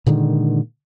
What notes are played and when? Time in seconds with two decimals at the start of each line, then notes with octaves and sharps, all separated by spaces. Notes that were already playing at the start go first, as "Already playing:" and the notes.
0.06 A#2 D3 D#3 G#3